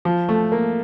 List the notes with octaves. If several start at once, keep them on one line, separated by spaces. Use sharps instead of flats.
F3
A3
A#3